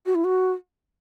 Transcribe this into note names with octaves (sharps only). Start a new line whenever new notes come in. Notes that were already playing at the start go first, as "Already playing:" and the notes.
F#4
E4
F#4